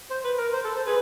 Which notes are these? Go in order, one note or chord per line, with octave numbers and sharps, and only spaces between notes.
C5
B4
A#4
C5
A4
C5
G#4 B4